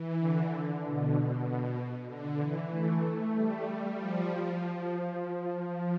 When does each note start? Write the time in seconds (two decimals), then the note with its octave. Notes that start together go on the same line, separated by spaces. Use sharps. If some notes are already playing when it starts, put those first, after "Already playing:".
Already playing: E3
0.19 D3
0.82 B2
1.45 B2
2.07 D3
2.38 E3
2.69 A3
3.01 A3
3.32 G3
3.95 F3
4.26 F3
4.57 F3
4.89 F3